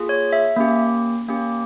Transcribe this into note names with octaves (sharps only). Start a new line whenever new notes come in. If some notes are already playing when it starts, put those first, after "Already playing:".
Already playing: A#3 F4 G#4
C#5
E5
A#3 C#4 G4
A#3 C#4 G4